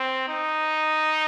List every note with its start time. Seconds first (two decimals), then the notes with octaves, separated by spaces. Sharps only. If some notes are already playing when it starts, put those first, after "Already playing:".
Already playing: C4
0.28 D#4